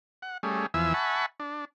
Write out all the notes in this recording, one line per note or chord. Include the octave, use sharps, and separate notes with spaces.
F#5
G3 A3 C#4 G#4
E2 E3 F3 E5 G#5 E6
E5 F#5 G#5 A5 B5 C#6
D4